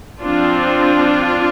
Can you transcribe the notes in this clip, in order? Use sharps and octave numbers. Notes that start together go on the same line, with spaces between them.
F3 C4 D4 F4